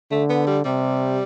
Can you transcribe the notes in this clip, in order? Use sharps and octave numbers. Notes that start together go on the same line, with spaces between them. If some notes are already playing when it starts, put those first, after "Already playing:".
D3 A3
B3
G3
C3 G3